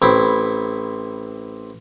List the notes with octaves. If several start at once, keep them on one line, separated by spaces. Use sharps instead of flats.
A1 C4 E4